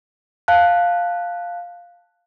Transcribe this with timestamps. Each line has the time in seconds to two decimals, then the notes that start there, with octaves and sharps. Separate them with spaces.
0.48 F5 A5 F#6